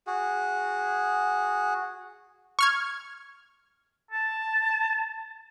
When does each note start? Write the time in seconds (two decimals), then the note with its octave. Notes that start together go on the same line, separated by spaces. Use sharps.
0.07 F#4 G#4
2.59 C#6 F6 G#6
4.11 A5